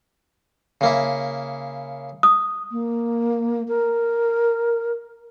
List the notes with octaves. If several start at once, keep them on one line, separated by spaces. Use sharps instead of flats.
C#3 A#3 E4
D#6
A#3
A#4